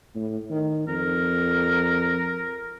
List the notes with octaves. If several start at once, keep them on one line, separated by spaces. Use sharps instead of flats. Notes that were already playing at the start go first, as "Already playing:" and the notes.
A2
D#3
F2 A#4